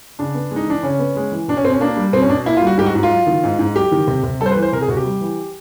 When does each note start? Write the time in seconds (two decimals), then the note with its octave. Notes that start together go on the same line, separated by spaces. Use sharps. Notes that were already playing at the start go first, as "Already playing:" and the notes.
0.19 C#3 D4
0.35 B3
0.51 G#3 D#4
0.67 E3 D4
0.83 C#3 C#4
0.99 B3
1.16 G#3
1.32 E3
1.48 B2 D4
1.57 C#4
1.64 B2 C4
1.73 C#4
1.80 A#3 D4
1.97 G3
2.13 B2 C4
2.22 C#4
2.29 B2 D4
2.46 A#3 E4
2.57 F4
2.62 G3 F#4
2.78 G#2 G4
2.86 F#4
2.95 G#2
3.03 F4
3.11 F#3
3.27 D#3
3.44 G#2
3.59 G#2
3.76 F#3 G4
3.92 D#3
4.08 C3
4.23 C3
4.41 G3 A4
4.46 C5
4.51 B4
4.56 E3
4.62 C5
4.73 C3 A#4
4.81 G#4
4.89 C3 F#4
4.97 G4
5.05 G3
5.21 E3